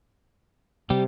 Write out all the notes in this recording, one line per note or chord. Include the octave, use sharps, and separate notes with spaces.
C3 G3 G4